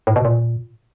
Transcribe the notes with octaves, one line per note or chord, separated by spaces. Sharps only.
A2
B2
A#2